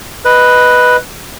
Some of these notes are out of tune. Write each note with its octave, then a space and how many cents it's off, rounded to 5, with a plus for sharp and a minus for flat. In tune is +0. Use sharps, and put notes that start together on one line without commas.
B4 +0 D#5 +0